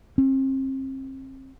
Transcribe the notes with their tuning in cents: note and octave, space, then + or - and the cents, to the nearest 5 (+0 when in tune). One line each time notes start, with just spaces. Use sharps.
C4 +35